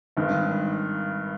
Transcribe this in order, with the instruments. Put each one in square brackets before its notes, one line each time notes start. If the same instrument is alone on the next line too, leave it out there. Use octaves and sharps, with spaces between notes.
[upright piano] G#1 G2 D#3 G#3